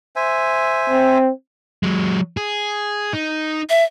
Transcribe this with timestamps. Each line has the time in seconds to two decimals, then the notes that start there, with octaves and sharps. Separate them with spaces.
0.16 C5 E5 G#5
0.89 C4
1.83 F#3 G#3
2.37 G#4
3.13 D#4
3.70 E5